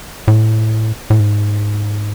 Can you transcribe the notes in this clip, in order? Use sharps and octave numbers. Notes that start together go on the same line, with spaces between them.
A2
A2
G#2